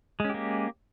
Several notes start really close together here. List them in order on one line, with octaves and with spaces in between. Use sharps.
G#3 C#4 G4 A#3